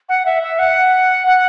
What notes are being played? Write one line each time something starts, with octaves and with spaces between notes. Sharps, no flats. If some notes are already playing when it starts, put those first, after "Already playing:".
F#5
E5
E5
F#5
F#5